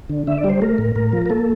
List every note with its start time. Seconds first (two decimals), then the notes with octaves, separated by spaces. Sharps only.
0.10 D3
0.27 D3 E5
0.38 D5
0.44 G3
0.49 C5
0.62 A3 A#4
0.78 A2
0.96 A2 A#4
1.13 F3
1.26 A#4
1.30 A#3 A4